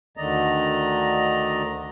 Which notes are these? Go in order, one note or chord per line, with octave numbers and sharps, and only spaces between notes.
D2 D3 D#3 D5 D#5 A#5